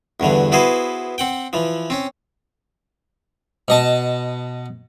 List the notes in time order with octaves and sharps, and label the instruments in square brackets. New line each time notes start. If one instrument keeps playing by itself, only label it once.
[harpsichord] E2 G2 D3 E3
B3 E4 F#4 G#4 B4 C5
C4 F#5 G5
E3 F3
C4 C#4
B2 D#5 A5